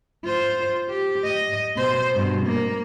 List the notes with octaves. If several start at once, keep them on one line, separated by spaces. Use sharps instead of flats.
F4 C5
G4
D#5
B2 C5
G2 B2
A#3